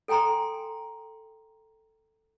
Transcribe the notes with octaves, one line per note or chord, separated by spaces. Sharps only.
A4 G5 G#5 A#5 C6